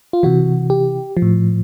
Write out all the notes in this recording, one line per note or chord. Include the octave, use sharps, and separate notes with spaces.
F4
C3 E3 F#4
G4
F3
A2